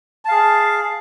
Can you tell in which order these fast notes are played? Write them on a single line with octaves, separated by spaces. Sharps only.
A5 F5 G#4